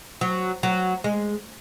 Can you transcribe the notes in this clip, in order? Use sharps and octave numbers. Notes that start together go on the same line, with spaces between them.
F#3
F#3
G#3